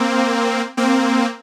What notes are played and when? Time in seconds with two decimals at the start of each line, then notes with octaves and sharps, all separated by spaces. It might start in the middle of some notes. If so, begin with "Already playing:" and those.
Already playing: A#3 C4
0.77 A#3 C4